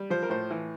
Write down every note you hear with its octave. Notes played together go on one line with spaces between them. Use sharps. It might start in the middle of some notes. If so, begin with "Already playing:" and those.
Already playing: G3
F3 C5
A#4
A2 C5
E3